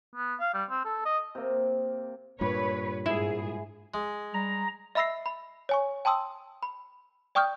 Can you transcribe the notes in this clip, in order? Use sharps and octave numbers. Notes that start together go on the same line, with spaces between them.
B3
F5
G3
C4
A4
D#5
C3 A#3
G2 A#2 B4 C#5
G#2 E4 G#4
G#3
G3 A#5
D#5 E5 B5 E6 A#6 C7
B5
C#5 G#5 C#6
G5 A5 C6 D#6 E6
B5
D5 G5 C#6 D#6 F6 G6